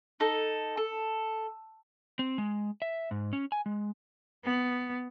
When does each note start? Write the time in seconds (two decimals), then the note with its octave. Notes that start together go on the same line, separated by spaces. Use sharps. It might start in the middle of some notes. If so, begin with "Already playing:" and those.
0.20 D#4 A4
0.77 A4
2.19 C4
2.38 G#3
2.82 E5
3.11 G#2
3.33 C#4
3.52 G#5
3.66 G#3
4.44 B3